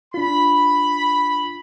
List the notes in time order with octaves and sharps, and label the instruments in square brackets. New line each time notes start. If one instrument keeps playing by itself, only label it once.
[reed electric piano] D4 F4 [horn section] B5